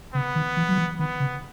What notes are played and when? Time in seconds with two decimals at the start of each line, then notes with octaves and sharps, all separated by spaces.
0.14 C#3 B3
0.35 D#3
0.57 E3
0.69 F#3
0.78 E3
0.99 D#3 B3
1.20 C#3